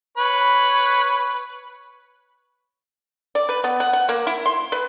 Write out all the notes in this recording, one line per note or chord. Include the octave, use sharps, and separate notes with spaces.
B4 C#5 B5
D5
B4
B3
F#5
F#5
A#3
E4
C6
B4